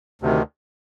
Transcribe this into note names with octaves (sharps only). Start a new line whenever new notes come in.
D2 C3 D#3